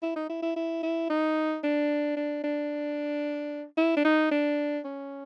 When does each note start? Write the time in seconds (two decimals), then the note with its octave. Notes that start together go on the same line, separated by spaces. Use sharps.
0.03 E4
0.16 D#4
0.29 E4
0.42 E4
0.56 E4
0.83 E4
1.10 D#4
1.64 D4
2.17 D4
2.44 D4
3.77 E4
3.97 D4
4.05 D#4
4.31 D4
4.84 C#4